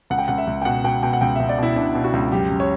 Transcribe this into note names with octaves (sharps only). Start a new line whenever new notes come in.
C#2 F#5
G5
C#2 F#5
E5
C#2
G5
B2 F#5
B2 G5
B2 G5
F#5
C#2 G5
C#2 E5
D5
B2 E4
B2 D4
B2
F#4
C#2
F#2 G4
F#2
C#5